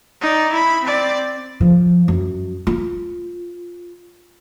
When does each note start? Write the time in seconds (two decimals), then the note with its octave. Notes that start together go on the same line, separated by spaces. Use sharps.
0.22 D#4 D5
0.52 E4 B5
0.83 C4 D5
1.61 F3
2.08 F#2
2.67 F4